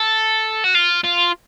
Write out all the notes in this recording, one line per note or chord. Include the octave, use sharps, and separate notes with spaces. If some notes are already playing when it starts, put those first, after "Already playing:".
Already playing: A4
F#4
F4
F4